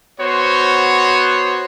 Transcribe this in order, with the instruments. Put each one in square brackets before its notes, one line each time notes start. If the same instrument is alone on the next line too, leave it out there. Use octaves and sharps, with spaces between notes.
[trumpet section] B3 F#4 C5 C#5